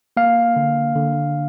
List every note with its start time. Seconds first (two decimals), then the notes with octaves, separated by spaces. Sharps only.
0.17 A#3 F5
0.56 D3
0.96 D3